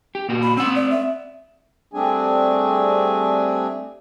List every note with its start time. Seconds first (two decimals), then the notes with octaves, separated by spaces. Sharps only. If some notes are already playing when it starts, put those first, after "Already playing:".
0.15 G4
0.29 A#2 F#4
0.42 B5
0.57 C4 F#5 E6
0.76 D5
0.91 E5
1.94 G3 A3 C4 D4 G#4 G#5